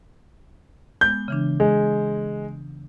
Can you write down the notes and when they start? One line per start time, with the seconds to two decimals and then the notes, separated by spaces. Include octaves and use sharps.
1.01 G#3 B3 G6
1.28 C#3 E3 D4
1.60 G#3